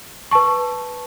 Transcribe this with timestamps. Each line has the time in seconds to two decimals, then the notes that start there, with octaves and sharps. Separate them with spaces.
0.31 B4 A5 C#6